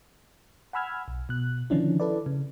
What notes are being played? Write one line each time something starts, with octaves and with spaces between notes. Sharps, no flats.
F#5 G#5 B5 E6 F6 G#6
B1
B2 F#6
D3 D#3 F3 C#4 D4 E4
E4 A4 B4 D5
C#3